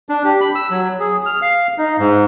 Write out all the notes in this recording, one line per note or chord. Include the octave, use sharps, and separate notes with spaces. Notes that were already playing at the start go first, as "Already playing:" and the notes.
D4
G4
B5
E6
F#3
G#4
F6
F5
D#4
G#2